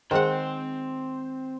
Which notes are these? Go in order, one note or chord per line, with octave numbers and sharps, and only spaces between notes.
D#3 G#3 C4 C5 F#5 G5